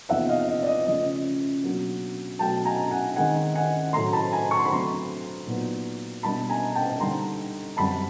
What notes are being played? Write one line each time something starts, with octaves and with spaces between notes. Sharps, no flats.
E2 C3 F3 A#3 D#4 E5 F#5
D#5 F5
D#5
D5
D#5
C#3 F3 A3 C#4 D#5
B2 F#3 A#3 D4
B2 F#3 A3 G5 A5
G#5 A#5
F#5 G#5
D#3 G#3 C4 D#4 F#5 G#5
F#5 G#5
A2 F#3 A3 A#5 C6
A5 B5
G#5 A#5
C#6
C6
B5
D3 F#3 A3 C4 A#5 C6
A#2 F#3 B3 D#4
B2 G3 A#3 D4 A5 B5
G#5 A#5
G5 A5
D3 G3 A#3 D#4 A#5 C6
F#2 D3 G3 C4 A5 B5